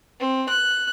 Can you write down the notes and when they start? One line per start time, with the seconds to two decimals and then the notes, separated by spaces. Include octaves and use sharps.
0.20 C4
0.49 F#6